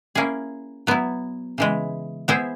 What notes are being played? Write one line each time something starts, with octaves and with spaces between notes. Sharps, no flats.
A#3 C#4 E4 G#4
F#3 B3 E4
C#3 E3 G#3
B3 E4 G#4 C5 E5